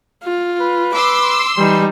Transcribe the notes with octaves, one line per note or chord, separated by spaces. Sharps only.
F4
B4
C6 D6 E6
E3 G3 D#4